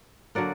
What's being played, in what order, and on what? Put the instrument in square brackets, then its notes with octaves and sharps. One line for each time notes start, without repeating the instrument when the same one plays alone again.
[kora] D3 F#3 A#3 D5 F#5